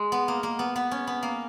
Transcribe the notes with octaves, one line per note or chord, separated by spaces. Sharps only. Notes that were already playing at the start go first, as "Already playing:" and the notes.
Already playing: G#3
B3
A#3
A#3
B3
B3
C#4
B3
A#3